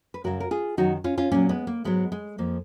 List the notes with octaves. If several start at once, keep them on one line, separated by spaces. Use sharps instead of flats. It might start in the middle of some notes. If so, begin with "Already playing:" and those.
B4
F#2 C#3 F#3 F#4 A#4
A#4
F4 G#4
F#2 D#3 F#3 D#4 F#4
C#4 F4
C#4 F4
A#2 F#3 A#3 C#4
G#3 B3
A#3
G#2 F#3 G#3 B3
G#3
F2 F3 A#3